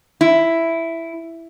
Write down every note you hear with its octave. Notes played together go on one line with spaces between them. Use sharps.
E4